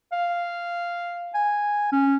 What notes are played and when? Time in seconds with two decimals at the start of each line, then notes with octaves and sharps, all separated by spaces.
0.12 F5
1.34 G#5
1.92 C#4